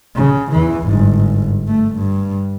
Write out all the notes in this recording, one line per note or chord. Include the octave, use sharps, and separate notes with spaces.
C#3
E2 E3
G1 G#2
A3
G2